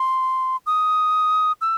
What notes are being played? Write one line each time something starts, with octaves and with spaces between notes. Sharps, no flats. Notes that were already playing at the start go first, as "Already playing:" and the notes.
Already playing: C6
D#6
E6